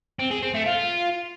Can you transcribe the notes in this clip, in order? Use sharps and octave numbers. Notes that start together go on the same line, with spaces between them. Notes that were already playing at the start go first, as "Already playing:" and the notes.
C4
G#4
C4
A3
F4